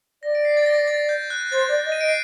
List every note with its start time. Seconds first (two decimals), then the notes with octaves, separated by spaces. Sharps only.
0.23 D5 A#6
0.35 D7
0.45 C7
0.57 A6
0.66 A#6
0.88 A6
1.09 G6
1.30 F#6
1.52 C5 A6
1.69 D5
1.85 D#5
1.92 D#7
2.00 D#5 D7
2.09 C7